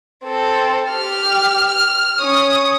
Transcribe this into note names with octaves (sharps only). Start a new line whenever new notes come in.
C4 A4
G4 F6
F6
C#4 D#6